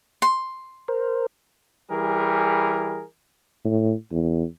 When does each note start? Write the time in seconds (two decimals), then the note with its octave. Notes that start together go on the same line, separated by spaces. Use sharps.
0.22 C6
0.88 A#4 C5
1.89 E3 G3 G#4 A#4
3.65 A2
4.11 E2